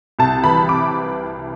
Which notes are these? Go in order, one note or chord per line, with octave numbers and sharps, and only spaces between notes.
C2 A5
E3 B5
C3 D6